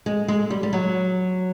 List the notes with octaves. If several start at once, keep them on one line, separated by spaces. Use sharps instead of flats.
G#3
G#3
G3
G3
F#3